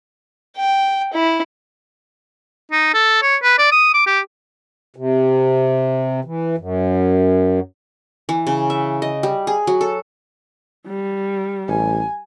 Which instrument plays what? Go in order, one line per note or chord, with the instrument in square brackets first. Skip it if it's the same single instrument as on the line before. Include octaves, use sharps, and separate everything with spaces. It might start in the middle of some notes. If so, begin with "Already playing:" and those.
[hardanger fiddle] G5
E4
[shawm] D#4
A4
C#5
B4
D5
D#6
D6
G4
[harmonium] C3
E3
F#2
[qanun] E3
C#3
E5
D#5
G3
G#4
F#3
A4
[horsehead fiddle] G3
[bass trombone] A1 [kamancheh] G#5